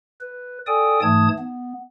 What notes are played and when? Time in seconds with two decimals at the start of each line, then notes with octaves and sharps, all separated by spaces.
0.21 B4
0.67 A4 D5 G5 G#5 D#6
1.02 G#2 E3 A3 A5 D#6 G#6
1.39 B3